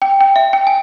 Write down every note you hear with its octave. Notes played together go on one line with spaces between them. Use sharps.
G5
G5
E5
G5
G#5